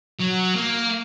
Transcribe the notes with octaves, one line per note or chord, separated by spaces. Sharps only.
F#3
A#3